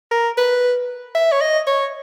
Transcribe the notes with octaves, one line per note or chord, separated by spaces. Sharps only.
A#4
B4
E5
C#5
D#5
C#5